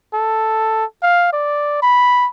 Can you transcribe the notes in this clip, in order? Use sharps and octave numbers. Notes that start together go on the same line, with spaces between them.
A4
F5
D5
B5